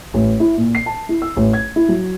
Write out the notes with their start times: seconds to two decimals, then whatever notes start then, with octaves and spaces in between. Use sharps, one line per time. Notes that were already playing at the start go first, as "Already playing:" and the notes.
0.14 A1
0.40 E4
0.57 A#2
0.75 C7
0.86 A5
1.09 E4
1.22 E6
1.37 A1
1.53 G#6
1.76 E4
1.89 F#3